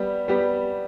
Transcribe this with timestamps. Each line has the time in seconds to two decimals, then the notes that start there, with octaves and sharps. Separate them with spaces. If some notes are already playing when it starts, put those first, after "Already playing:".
Already playing: G3 B3 G4
0.28 G3 B3 G4